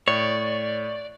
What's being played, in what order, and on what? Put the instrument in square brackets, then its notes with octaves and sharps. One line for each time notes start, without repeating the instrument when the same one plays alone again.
[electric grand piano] A2 [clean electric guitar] C#5 [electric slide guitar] D5